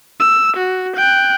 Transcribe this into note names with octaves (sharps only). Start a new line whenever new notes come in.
E6
F#4
G5 F#6